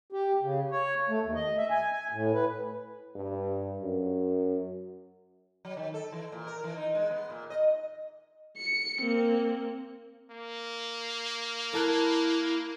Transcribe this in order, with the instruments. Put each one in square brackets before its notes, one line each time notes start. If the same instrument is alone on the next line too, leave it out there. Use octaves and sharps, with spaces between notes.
[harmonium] G4
C#3
C#5
A3
D#2
D#5
E5
G#5
G#5
A2
B4
[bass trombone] G2
F#2
[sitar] F#3
D#3
A4
E3
A#2
A#4
E3
D#4
G#3
B3
A#2
D#5
[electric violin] C#7
A#3 C4
[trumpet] A#3
[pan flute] E4 [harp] A#4 A5 F#6